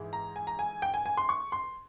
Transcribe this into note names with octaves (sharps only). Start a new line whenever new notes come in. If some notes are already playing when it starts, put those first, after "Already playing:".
Already playing: G#2 E3 G#3
A#5
G#5
A#5
G#5
G5
G#5
G#5
C6
C#6
C6